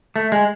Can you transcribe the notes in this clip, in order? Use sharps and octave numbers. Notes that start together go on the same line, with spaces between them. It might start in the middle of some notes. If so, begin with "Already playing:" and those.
A3
G#3